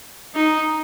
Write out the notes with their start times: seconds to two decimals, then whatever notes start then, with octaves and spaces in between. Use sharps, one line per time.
0.35 D#4